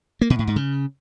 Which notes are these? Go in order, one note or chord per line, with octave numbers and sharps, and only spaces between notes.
A#3
B2
A2
G#2
C#3